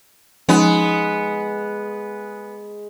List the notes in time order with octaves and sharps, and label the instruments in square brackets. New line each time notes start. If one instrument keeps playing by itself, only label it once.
[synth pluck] F3 C#4 D#4 [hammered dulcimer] G#3 [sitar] B3